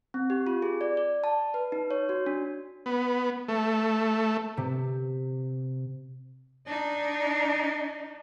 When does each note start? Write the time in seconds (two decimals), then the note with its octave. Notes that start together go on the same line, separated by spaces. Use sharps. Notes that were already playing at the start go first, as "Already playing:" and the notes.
0.14 C4
0.30 G4
0.47 F4
0.62 G#4
0.81 D5
0.97 D5
1.24 A5
1.54 B4
1.72 D#4
1.91 C#5
2.09 F#4
2.26 D4
2.86 B3
3.48 A3
4.57 C3
6.67 D4 D#4